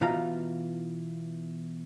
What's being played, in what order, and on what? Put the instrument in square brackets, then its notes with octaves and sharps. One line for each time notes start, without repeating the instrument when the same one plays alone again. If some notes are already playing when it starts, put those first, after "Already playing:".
[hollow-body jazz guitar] B2 E3 F4 F5 A#5